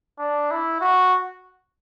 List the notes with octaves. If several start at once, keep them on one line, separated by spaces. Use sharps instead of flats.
D4
E4
F#4